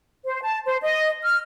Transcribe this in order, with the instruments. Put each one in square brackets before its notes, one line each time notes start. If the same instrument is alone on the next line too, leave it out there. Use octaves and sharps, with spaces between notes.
[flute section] C5
A5
C5
D#5
F6